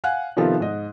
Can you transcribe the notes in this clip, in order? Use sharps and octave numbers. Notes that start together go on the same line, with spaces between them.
F5 F#5 G#5 F#6
C3 D#3 F3 B3 F4 A4
G#2 D#5